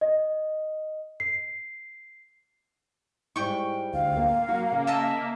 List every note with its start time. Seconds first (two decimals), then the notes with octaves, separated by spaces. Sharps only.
0.01 D#5
1.20 C7
3.36 G#2 G3 E4 G5 C#6
3.93 D2 F5
4.17 A#3
4.49 F#3 F#4
4.72 C#3
4.87 D#5 E5 A5